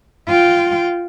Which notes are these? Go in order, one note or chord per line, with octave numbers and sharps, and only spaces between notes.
F4 G5